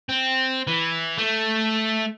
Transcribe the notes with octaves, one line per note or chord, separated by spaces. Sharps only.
C4
E3
A3